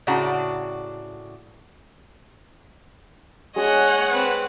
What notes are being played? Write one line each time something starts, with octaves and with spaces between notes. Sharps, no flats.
A2 C#3 D4 F#4 A#5
G#3 D4 G#4 C#5 D#5 F#5
C4 B4